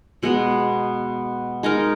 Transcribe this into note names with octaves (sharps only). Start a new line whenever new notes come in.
B2 G#3 B3
G#3 D#4 A#4